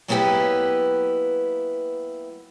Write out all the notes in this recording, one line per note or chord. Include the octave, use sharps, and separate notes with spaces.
F#3 A#3 B3 E4 G4 B4